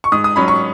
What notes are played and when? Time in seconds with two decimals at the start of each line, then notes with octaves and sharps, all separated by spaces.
0.04 C#6
0.12 G#2 D#6
0.24 D#6
0.36 F#3 C#4 B5
0.48 C#6